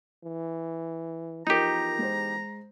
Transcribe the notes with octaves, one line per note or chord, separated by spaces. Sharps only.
E3
E2 F3 D#4 G4 A#4 A#5
G#3 C5